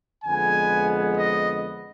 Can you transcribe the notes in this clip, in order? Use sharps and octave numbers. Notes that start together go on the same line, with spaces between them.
F2 D3 G#3 B3 G#5
D#5